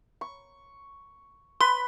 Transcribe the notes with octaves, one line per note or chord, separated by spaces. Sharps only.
C#6
B4 B5 C6